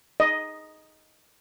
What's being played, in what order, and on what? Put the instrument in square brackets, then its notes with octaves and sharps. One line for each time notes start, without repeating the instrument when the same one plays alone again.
[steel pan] D#5